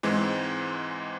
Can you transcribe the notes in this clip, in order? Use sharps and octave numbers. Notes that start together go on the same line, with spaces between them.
G#2 E3 G#3 C4